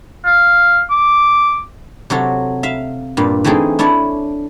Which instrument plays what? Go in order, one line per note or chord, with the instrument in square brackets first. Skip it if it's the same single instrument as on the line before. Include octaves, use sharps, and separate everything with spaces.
[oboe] F5
D6
[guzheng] C3 F#3 F#4 A4
E5 F5
G2 A#2
E3 A3 C4 D#4 G#4 A4
D4 E4 C#5 A5